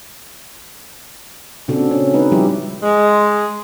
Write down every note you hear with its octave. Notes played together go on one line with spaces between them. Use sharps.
A#2 C#3 C4 D4 F#4 A4
C#4
G#3 D#4 B4
F3 G3 E4 G4
G#3